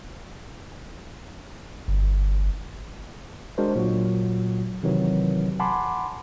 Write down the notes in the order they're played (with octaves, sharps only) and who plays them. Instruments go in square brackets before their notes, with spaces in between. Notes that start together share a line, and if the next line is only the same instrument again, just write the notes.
[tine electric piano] G1
G#3 D4 F#4 A#4 C5
A#2 F#3 F#4
C3 D#3 E3 F#3
F#5 G#5 A5 B5 C6 D6